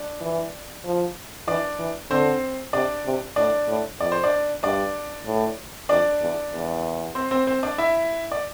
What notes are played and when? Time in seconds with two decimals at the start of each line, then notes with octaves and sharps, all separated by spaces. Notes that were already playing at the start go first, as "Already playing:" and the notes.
Already playing: D4
0.21 E3
0.84 F3
1.47 E3 D4 D5
1.79 E3
2.10 D3 C4 C5
2.73 C3 D4 D5
3.05 C3
3.36 A2 D4 D5
3.68 A2
3.99 F2 D5
4.12 C5
4.24 D4 D5
4.63 G2 D4 D5
5.26 A2
5.89 F2 D4 D5
6.21 E2
6.52 E2
7.15 C4 C5
7.31 C4 C5
7.47 C4 C5
7.63 D4 D5
7.78 E4 E5
8.32 D5